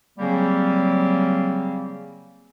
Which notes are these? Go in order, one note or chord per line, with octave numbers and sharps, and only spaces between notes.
C#3 F#3 G3 A#3 C4